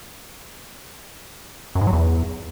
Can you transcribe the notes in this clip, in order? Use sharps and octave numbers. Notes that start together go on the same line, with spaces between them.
F#2
G#2
F#3
E2